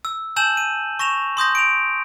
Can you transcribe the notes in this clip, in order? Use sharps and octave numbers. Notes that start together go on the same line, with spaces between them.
E6
G#5 A5 E6 G6 E7 F#7
D#7
C#6 A#6 E7 F7
C6 D#6 G6 A#6
D7 F7